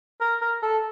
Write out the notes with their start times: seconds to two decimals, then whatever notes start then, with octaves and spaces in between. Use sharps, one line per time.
0.21 A#4
0.42 A#4
0.62 A4